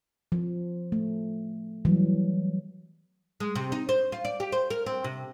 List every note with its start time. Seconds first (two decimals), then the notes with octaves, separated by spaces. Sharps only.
0.32 F3
0.92 A3
1.85 E3 F#3 G3
3.40 G#3
3.55 C3
3.72 D#4
3.89 C5
4.12 F4
4.25 D5
4.40 G4
4.52 C5
4.70 A#4
4.86 C4
5.04 C3